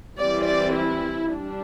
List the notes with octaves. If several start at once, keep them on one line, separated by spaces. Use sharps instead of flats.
E3 G3 C4 D5
D5
E4
G3 D4